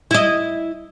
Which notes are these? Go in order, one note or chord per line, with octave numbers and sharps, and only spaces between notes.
E4 D#5